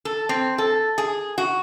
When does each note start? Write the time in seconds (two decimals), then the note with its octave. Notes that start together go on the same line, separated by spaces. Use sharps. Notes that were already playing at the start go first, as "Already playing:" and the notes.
0.05 A4
0.29 C4
0.58 A4
0.98 G#4
1.38 F#4